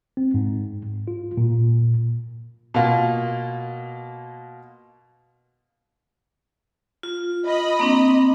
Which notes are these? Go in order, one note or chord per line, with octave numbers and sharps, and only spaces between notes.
C4
G#2
F4
A#2
B2 A#3 F4
F4
D#5 B5
A#3 C4 D4